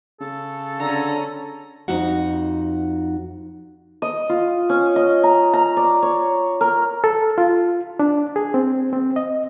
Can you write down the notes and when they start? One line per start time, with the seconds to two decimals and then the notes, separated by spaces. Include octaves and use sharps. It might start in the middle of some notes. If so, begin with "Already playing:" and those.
0.21 C#3 A4
0.80 D3 C#4 A#5
1.88 F2 D#4 F#4 F#5
4.02 D#5
4.29 F4
4.69 C#4
4.96 D#5
5.23 A#5
5.53 A#5
5.77 D5
6.02 C#5
6.61 A#4
7.04 A4
7.38 F4
7.99 D4
8.36 G#4
8.54 C4
8.93 C4
9.16 D#5